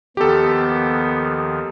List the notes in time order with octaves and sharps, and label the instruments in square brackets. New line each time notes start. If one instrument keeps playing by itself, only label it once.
[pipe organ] D#2 D#3 F3 [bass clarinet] B3 [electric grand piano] G4 A4